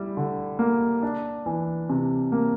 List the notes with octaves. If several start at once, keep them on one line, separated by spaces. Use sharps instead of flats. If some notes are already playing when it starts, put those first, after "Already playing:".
Already playing: G3 E4
D3
A#3
D4
E3
C3
A#3